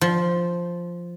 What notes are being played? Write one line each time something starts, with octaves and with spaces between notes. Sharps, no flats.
F3